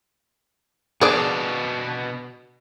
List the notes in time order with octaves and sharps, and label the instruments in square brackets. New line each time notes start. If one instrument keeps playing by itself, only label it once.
[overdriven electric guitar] B2 D4 [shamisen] G#4 D5